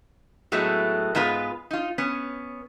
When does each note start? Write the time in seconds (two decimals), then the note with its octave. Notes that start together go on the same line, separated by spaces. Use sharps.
0.52 A2 F#3 G#3 A3 B3 A4
1.15 G#2 G#3 B3 F4 B4
1.71 D#4 F4
1.98 B3 C#4